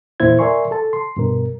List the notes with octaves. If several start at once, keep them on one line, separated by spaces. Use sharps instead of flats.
E2 A#2 A#3 E4 C5 G#6
A#4 D5 E5 G#5 C6 C#6
A4 A5
C6
G2 B2 A#4